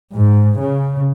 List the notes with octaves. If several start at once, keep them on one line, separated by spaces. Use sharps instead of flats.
G#2
C#3